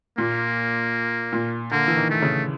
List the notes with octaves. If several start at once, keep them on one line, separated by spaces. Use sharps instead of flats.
A#2 A#3
A#2
D3 A#3
E3
D#3
A3
C#3